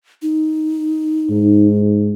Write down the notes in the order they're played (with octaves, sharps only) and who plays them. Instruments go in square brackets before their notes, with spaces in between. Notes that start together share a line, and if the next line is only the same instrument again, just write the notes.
[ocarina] D#4
[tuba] G#2